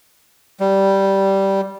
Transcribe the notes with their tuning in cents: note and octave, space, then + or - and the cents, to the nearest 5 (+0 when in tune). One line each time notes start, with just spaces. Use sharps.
G3 -10